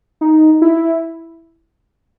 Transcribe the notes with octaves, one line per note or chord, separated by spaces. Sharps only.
D#4
E4